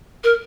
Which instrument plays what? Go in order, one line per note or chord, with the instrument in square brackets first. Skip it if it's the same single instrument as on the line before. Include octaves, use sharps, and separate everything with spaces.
[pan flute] A#4